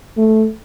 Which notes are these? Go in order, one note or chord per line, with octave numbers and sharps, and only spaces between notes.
A3